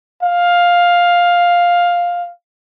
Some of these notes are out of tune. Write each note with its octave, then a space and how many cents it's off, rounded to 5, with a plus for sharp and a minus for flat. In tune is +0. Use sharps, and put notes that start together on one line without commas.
F5 +5